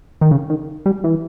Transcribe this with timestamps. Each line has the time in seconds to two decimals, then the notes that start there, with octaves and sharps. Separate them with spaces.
0.21 D#3
0.31 C#3
0.50 D#3
0.86 G3
1.04 E3